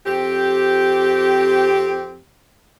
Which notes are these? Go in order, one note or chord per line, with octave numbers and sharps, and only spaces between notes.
F2 C4 G4